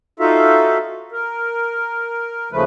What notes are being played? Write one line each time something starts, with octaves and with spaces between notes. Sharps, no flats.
D#4 F4 F#4 A4 E5 F5
A#4
D#2 C#3 F3 A3 B4